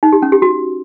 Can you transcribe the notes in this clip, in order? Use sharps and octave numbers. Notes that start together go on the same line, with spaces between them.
D#4
G4
C#4
G4
F#4